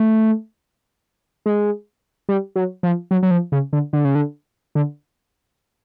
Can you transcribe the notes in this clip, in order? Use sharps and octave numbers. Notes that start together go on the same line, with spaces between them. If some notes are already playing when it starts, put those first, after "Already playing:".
Already playing: A3
G#3
G3
F#3
F3
F#3
F#3
F3
C#3
D3
D3
C#3
D3
D3